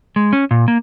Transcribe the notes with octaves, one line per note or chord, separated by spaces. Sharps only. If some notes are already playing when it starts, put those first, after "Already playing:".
G#3
C#4
A#2
A#3